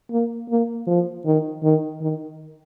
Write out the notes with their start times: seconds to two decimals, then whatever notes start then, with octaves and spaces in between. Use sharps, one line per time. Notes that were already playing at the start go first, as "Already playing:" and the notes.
0.11 A#3
0.49 A#3
0.87 F3
1.25 D#3
1.63 D#3
2.01 D#3